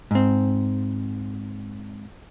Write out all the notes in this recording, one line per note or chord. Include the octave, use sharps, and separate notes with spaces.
G#2 C4